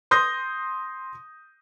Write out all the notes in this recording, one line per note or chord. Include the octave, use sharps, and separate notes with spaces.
C6 D#6 G6 A#6